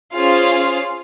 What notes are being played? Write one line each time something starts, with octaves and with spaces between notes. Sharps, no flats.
C#4 F4 G#4 C5 F5